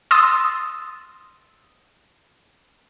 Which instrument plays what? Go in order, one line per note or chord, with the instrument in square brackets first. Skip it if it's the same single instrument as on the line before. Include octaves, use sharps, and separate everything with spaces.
[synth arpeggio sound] C6 D#6 E6 A6